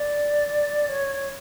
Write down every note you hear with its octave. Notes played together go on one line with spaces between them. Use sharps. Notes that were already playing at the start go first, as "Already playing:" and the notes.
Already playing: D5
C#5